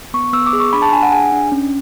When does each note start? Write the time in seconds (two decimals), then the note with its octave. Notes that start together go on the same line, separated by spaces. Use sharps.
0.14 B3 C#6
0.33 B3 E6
0.46 D6
0.53 G#4
0.60 C#6
0.73 D4 B5
0.82 A5
0.93 D4 G#5
1.03 F#5
1.12 G#4 G#5
1.32 D4
1.52 C#4